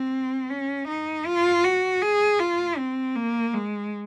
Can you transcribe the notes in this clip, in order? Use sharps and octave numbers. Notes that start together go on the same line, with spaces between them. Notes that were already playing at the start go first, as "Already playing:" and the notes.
Already playing: C4
C#4
D#4
F4
F#4
G#4
F4
C4
A#3
G#3